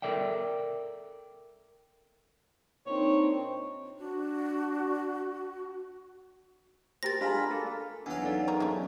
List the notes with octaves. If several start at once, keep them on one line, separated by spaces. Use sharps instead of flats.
A4 A#4 D5 E5 G5
A#2 C4 D4 D#4 C#5
D4 F#4
G4 A#4 C5 A6 A#6
D4 F4 G#4 A#5 B5
A#3 A4
E2 F#3 D4 F5 G#5
C#4 D#4 A4 D5
D#3 G#3 A#5
B1 G#3 A3 C#4 D#5